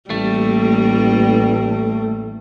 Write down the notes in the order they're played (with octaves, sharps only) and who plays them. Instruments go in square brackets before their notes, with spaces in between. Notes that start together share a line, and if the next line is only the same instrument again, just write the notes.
[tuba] A1 [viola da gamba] G3 A#3 [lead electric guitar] A3